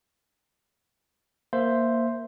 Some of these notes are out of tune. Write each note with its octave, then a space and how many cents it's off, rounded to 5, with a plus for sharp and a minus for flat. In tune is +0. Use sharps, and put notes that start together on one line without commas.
A#3 +0 C5 +0 E5 +10